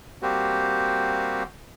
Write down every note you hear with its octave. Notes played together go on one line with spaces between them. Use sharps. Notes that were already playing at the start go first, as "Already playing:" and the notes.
G3 A#3 C4 F#4 G4